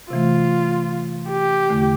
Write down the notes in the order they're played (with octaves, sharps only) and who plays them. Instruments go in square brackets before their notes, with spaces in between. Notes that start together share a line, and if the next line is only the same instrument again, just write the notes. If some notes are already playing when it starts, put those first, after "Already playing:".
[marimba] C3 E3 A3 [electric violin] F4
[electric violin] G4
[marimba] E2 D3 A3